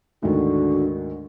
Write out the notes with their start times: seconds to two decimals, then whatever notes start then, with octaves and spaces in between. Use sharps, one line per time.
0.23 D2 G#2 D3 D#3 F#4